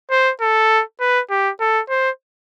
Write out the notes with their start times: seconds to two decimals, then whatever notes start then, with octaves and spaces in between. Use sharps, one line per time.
0.11 C5
0.41 A4
1.00 B4
1.30 G4
1.60 A4
1.89 C5